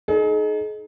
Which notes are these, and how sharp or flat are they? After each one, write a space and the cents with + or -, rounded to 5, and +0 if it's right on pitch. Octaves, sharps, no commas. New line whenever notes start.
D#4 -5 G#4 +40